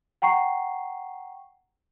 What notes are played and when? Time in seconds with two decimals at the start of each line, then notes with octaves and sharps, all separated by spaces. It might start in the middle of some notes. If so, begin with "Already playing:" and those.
0.22 F#5 G5 A#5 C#6 C7